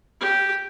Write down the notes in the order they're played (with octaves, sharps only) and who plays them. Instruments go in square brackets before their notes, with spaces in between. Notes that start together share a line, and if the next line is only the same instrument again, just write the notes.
[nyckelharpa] G4